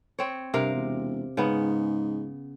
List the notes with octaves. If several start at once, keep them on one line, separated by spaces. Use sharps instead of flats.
C4 C#5
G2 C3 A#4 F5
E1
G#2 C#3 B3